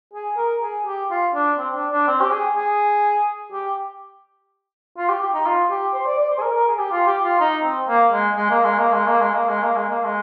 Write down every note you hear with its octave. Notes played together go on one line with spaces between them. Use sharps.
G#4
A#4
G#4
G4
F4
D4
C4
D4
D4
C4
G4
G#4
G#4
G4
F4
G4
G4
D#4
F4
G4
C5
D5
D5
C5
G#4
A#4
A#4
G#4
G4
F4
G4
F4
D#4
C4
A#3
G#3
G#3
A#3
G#3
A#3
G#3
A#3
G#3
A#3
G#3
A#3
G#3
A#3
G#3